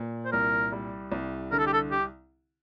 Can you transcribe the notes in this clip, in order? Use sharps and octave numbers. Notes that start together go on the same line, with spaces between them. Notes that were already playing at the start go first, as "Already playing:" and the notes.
Already playing: A#2
C5
C2 A#4
G3
C2
D3 A#4
A4
G4
A4
G4